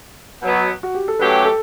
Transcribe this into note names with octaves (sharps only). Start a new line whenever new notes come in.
B2 F#3 B3
F#4
G4
A4
F#3 A3 C#4 G4 B4
A4